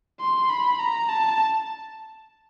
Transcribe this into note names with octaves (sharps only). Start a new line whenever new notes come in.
C6
B5
A#5
A5